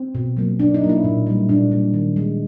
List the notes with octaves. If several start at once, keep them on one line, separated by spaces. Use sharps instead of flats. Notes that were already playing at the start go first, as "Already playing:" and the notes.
Already playing: C4
B2
F#3 A#3
B2 D4
D#4
F#3 A#3
E4
A#2
G3 A#3
A#2 D4
G3 A#3
D#3
G#3